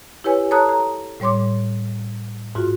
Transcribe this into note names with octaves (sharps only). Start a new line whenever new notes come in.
E4 G4 B4 C#5 G#5
A4 C#5 A5 A#5 D#6 F#6
A#5
A2 G3 C#5 C6 D6
G#2 F4 F#4